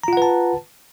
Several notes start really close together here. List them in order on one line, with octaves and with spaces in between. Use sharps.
A#5 F4 F#5 B4 A5